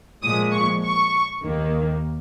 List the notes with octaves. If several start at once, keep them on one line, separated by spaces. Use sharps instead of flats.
A#2 F3 G#3 D#6
C#6
C#6
D#2 D#3 A#3